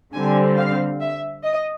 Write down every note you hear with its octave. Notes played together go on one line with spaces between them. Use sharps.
D3 G3 C4 G#5
F5
E5
D#5